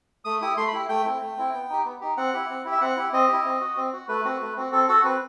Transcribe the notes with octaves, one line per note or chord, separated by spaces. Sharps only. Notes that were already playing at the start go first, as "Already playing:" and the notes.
A3 D#6
E4 G4 D#6
A3 C6
B5
E4 G4
A3 G5
C4 E4
A3
C4 E4
B3
D#4 G4
B3
D#4 G4
C4 F#5
E4 G4
C4
E4 G4
E5
C4 F#5
E4 G4
C4 D#5
E4 G4
C4
F#4
C4
F#4
A3 B4
C4 F#4
A3
C4 F#4
C4 A4
F#4 A4
C4 B4